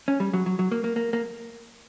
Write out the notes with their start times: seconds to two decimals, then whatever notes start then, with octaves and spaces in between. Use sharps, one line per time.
0.08 C#4
0.20 G3
0.33 F#3
0.46 F#3
0.59 F#3
0.72 A#3
0.84 A#3
0.96 A#3
1.13 A#3